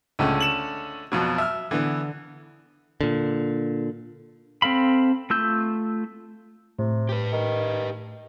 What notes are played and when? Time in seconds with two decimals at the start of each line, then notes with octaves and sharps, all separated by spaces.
0.19 C#2 D3 A3 C#4
0.40 E7 F#7
1.12 F2 B2 F#3
1.38 E5 F6
1.71 D3 E3 B3
3.01 A#2 D3
4.62 C4 A4 F5 B5
5.30 A3 F4 E6 G6
6.79 A2 C3
7.09 G4 B4
7.32 D#3